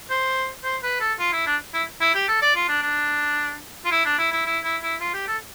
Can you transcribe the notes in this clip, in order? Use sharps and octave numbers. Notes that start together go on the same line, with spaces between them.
C5
C5
B4
A4
F4
E4
D4
E4
E4
G4
A4
D5
F4
D4
D4
F4
E4
D4
E4
E4
E4
E4
E4
F4
G4
A4